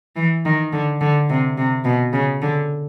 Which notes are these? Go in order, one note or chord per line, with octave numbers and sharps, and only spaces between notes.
E3
D#3
D3
D3
C3
C3
B2
C#3
D3